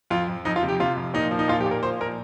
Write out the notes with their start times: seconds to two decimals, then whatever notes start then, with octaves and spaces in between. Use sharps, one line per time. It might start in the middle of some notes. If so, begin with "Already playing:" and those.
0.10 F2 F4
0.28 F2
0.45 F2 D#4
0.56 F4
0.63 C3
0.69 G4
0.80 C3 F4
0.97 F2
1.14 A#2 D#4
1.31 F3
1.39 D#4
1.48 A#2 F4
1.60 G4
1.66 A#2
1.71 A#4
1.83 F3 C5
2.00 A#2 A#4